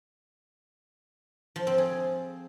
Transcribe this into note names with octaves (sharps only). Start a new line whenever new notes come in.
F3
C4
G#4